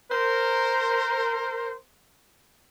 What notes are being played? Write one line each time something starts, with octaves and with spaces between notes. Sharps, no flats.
A#4 C5